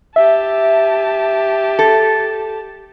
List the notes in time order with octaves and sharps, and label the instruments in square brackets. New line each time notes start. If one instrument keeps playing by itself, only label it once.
[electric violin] G4 A5 [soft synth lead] E5
[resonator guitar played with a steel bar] A4